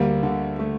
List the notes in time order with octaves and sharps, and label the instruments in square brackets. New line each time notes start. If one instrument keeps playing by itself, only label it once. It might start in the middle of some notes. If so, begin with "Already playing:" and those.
Already playing: [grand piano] D2 [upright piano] G3 A#3
[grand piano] D3
A3